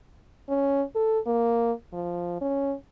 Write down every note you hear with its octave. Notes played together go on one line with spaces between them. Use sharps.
C#4
A4
A#3
F3
C#4